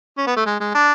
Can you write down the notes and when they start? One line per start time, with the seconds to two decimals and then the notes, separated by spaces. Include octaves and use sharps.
0.18 C#4
0.27 B3
0.36 A3
0.46 G#3
0.60 G#3
0.75 D4